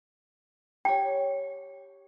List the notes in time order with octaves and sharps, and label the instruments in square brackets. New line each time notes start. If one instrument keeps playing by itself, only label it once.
[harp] G4 C#5 [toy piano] G5